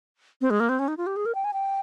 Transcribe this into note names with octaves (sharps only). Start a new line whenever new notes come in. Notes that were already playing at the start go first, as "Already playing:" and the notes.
C4
G#3
A#3
C4
C#4
D#4
F4
G4
G#4
A#4
G5
G#5
G5